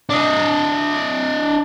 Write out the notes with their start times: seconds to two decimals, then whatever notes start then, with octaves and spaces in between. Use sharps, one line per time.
0.10 D4 D#5